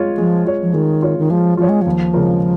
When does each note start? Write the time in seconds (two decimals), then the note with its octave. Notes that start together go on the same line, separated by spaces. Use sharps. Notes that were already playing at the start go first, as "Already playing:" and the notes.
Already playing: G#3 F4 C#5
0.18 F3 G#3
0.46 F4 C#5
0.63 F3
0.73 D#3 G#3
1.02 F4 C#5
1.18 D#3
1.30 F3 G#3
1.57 F3 F4 C#5
1.69 G#3
1.82 D#2 F3
2.13 C#3 G#3 F4 A#4